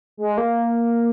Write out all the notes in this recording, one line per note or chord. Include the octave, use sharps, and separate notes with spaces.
G#3
A#3